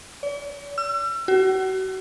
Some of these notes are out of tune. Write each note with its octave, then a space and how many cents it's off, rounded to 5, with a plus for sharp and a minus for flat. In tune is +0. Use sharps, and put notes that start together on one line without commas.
D5 -45
E6 +40
F#4 +35